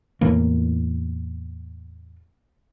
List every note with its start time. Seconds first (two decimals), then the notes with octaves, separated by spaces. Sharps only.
0.21 E2 A2 E3 A#3